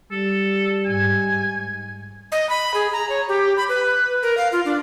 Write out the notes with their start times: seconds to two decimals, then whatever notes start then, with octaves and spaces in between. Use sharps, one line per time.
0.12 G3 A4
0.85 G#2 G#5
2.32 D#5
2.49 B5
2.74 G#4
2.92 A#5
3.09 C#5
3.28 G4
3.57 B5
3.69 B4
4.23 A#4
4.37 F5
4.52 F4
4.65 D4